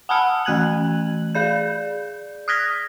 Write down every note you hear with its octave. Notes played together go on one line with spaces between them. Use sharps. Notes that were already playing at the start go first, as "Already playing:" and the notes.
F#5 G#5 A5 B5 E6 F6
E3 A3 F#6 G#6 F#7
G#4 D5 G6
D#6 F6 F#6 G#6 A#6 B6